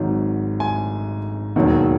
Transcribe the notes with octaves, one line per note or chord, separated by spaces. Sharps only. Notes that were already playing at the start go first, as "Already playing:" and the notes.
Already playing: G#1 G#2 D#3 F#3
G#5
E1 D#2 D#3 F#3